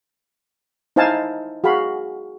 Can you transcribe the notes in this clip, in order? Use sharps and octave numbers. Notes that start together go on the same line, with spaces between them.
D#4 E4 C5 F5 G#5 A5
F#4 G#4 F5 B5